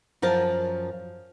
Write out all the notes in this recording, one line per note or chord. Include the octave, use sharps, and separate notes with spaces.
F#2 F3 A#4 A5